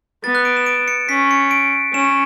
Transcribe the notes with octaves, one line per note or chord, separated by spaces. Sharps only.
B3 A6
F#6
D7
E7
D7
C#7
C#4 B6
C#7
D7
C#4 E7